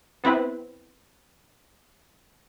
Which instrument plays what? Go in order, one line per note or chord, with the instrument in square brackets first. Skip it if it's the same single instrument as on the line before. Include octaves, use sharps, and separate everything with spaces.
[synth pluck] B3 C4 E4 B4